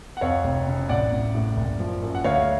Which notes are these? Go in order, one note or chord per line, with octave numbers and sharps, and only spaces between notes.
F#5
F2 C#5 F5
F1
C#3
A1 D5 F#5
A1
A2
F#1
F3
F#2
F#5
D2 C#5 F5